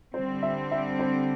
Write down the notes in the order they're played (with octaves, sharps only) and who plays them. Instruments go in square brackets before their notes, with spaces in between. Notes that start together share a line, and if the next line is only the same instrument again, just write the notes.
[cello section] D3 G3 C4 [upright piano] C5
[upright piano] E5
E5
C5